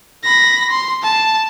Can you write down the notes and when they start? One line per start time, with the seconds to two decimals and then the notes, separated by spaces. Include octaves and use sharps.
0.24 B5 A#6
0.70 C6
1.03 A5